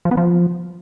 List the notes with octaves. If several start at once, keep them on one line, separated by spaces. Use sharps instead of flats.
F3
B3
F3